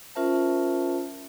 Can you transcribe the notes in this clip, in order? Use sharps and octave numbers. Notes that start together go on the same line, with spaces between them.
C#4 F4 A#4 C5 E5 A5